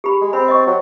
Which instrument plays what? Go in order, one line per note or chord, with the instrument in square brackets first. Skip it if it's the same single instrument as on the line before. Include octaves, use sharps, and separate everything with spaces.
[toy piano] G4 B5
[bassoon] G#3
[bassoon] C4 [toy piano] B5
[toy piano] D#5 C#6
[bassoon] F#3